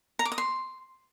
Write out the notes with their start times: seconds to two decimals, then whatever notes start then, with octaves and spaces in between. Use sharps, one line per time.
0.19 A#5
0.25 D6
0.32 D#6
0.38 C6